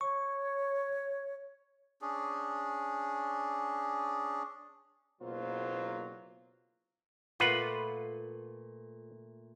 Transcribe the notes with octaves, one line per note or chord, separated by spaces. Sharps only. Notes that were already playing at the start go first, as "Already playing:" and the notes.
C#5 C#6
C#4 D4 G#4
F#1 B2 F#3 A#3 F4 C5
A#2 A3 F4 B4 F#5